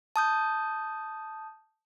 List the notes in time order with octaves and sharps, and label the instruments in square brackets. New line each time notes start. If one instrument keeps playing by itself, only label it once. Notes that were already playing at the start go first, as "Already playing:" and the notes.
[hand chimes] A5 D#6 G6